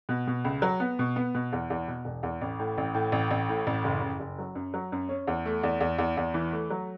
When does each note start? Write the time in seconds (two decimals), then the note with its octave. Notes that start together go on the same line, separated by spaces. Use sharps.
0.09 B2
0.27 B2
0.44 C#2
0.62 F#3
0.80 B3
0.99 B2
1.16 B3
1.34 B2
1.53 E2
1.70 E2
1.88 B2
2.05 E1
2.23 E2
2.41 A1
2.60 A2
2.78 A1
2.94 A2
3.12 A1
3.31 A1
3.49 A2
3.67 A1
3.84 F#1
4.02 F#1
4.20 F#1
4.39 F#3
4.55 F#2
4.74 F#3
4.92 F#2
5.09 C#4
5.27 E2
5.45 A3
5.63 E2
5.81 E2
5.98 E2
6.17 E2
6.34 E3
6.52 A3
6.70 F#3